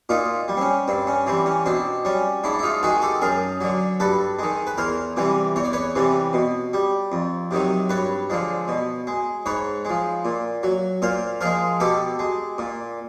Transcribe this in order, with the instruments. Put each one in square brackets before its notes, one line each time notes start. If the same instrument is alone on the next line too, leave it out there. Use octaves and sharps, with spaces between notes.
[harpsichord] A#2 D#4 F4
G3
C4
C#4
G2 C4
C#4
E3 G3 C4
C#4
B2 C4 D4
G3 C#4
G#2 D4 E4
E4
D#4 F4
D#3 G#3 F#4 G#4
G4 A4
F#2 G#4 A#4
D3 F#3
G2 A4 B4
D#3 G#3
B4
E2 A#4 C5
C3 E3 G3
E2 C#5
D5
B4 C#5
C3 E3 G3
B2
G3
F2
C3 D#3 F#3
G2 B4 C#5
D3 F3 G#3
B2
G#3
G#2 B4 C#5
F3 G#3
A#2
F#3
A#2 A#4 C5
F3 G#3 G#4 A#4
B2 G4 A4
G#3
A#2